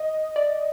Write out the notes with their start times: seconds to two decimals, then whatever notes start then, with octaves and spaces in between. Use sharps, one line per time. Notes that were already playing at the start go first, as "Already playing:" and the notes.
Already playing: D#5
0.36 D5